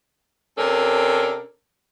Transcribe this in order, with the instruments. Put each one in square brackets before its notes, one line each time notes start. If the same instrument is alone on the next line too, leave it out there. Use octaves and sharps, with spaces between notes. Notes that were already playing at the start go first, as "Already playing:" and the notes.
[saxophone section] C3 C#4 D4 A4 A#4